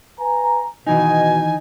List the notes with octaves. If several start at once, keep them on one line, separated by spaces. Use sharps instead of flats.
B4 G#5 A#5
B2 D#3 E3 D#4 G#5